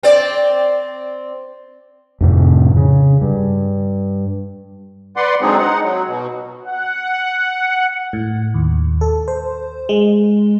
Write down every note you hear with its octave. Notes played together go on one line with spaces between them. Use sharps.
C4 D5
F2 A2 C3
C#3
G2
B4 D5 F#5 C6
D3 F#3 G#3 C4 D#4 G#4
D#4 F#5
F#3
B2
F#5
A2
D#2
A4
C5
G#3